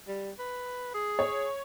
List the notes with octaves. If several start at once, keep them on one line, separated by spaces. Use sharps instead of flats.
G3
B4
G#4
C#5